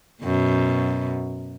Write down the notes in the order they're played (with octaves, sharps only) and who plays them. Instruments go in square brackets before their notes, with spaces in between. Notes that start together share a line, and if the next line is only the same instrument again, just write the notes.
[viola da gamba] F#2 B2